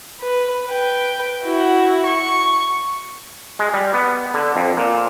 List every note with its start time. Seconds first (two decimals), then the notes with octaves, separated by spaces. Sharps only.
0.21 B4
0.66 B4 G5
1.44 E4 F#4
2.07 C#6
3.59 G#3
3.74 G3
3.94 B3
4.34 D3
4.56 F2
4.77 A#2